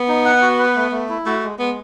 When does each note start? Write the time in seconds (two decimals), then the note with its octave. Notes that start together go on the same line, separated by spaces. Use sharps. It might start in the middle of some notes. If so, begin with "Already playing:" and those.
Already playing: B3
0.08 D#4
0.25 F#5
0.42 F#4
0.59 B4
0.76 A3
0.92 A3
1.09 E4
1.26 A3 F#4
1.43 G#3
1.59 G#3 B3